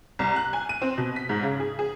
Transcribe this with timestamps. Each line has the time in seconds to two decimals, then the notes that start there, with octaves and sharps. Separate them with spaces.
0.19 C2
0.36 F#6
0.53 G#5
0.69 D#7
0.82 C4
0.98 B2
1.16 B6
1.29 G#2
1.43 C#3
1.60 G#4
1.79 G#4